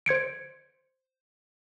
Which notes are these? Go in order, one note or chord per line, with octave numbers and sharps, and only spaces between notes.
C5 G#6 C#7 D7